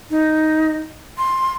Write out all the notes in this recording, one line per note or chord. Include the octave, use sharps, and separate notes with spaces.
D#4
C6